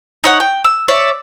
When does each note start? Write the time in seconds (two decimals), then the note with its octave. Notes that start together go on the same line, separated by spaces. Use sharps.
0.24 D#4 C#5 F#5
0.40 G5
0.64 E6
0.88 C#5 D5 E5